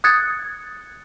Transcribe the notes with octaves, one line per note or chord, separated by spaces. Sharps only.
D#6 F#6 G#6 A6 C#7